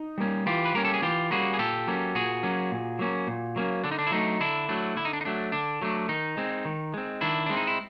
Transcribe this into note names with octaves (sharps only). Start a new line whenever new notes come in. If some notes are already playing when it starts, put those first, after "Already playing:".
Already playing: D#4
G3 A#3 C#4
E3 F4 G4
B4
G3 A#3 C#4 A#4
A4
G#4
E3 F4 G4
G3 A#3 C#4 F#4 G#4
G#4
A#2 G4 A4
F#3 A#3 C#4
A#2 F#4 G#4
F#3 A#3 C#4
A#2
F#3 A#3 C#4
A#2
F#3 A#3 C#4
D3 D4
D#4
D4
E4
F#3 A3 D4 D#4
D3 D4 E4
F#3 A3 D4
D3 E4
D#4
D4
D#4
F#3 A3 D4
D3 D4
F#3 A3 D4
D#3 D#4
G#3 C4
D#3
G#3 C4
D#3 D4 E4
G#3 C4 D4
D#4
E4